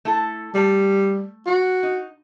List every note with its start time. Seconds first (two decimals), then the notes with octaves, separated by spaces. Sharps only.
0.05 A3 E4 A4
0.55 G3 A3
1.47 F#4
1.83 D#4